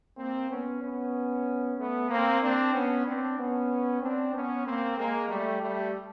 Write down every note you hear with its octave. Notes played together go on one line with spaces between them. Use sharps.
A#3 C4
B3 C#4
B3 C#4
A3 B3
A#3 C4
C4 D4
B3 C#4
C4 D4
B3 C#4
C4 D4
B3 C#4
A#3 C4
G#3 A#3
G3 A3
G3 A3